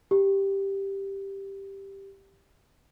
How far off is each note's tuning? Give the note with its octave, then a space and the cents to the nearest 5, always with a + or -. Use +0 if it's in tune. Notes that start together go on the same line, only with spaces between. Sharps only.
G4 +0